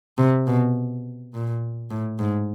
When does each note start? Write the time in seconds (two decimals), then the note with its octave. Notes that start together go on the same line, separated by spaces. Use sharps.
0.18 C3
0.47 B2
1.34 A#2
1.91 A2
2.19 G#2